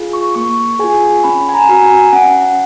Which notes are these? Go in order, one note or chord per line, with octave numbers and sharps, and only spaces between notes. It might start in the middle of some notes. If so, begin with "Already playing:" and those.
Already playing: F4 G#4
C#6
A#3 C#6
F4 G#4 G#5
C#4 B5
G#5
A#5
F#4 A#5
G#5
C#4 F#5